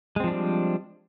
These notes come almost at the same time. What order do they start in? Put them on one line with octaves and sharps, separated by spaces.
G#3 C4 F3 D4 G3